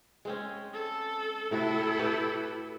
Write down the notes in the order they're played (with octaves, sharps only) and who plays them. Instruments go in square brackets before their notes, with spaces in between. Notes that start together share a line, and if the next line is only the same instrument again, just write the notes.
[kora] G#3 C4 C#4
[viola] A4
[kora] A2 C3 F#4 [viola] E4 A4
[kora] F#4 G4 B4